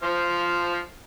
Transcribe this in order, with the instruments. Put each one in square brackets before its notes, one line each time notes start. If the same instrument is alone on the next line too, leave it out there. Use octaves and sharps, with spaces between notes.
[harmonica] F3 C5 F6